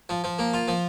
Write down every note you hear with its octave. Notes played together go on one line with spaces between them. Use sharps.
F3
F3
A#3
F4
F3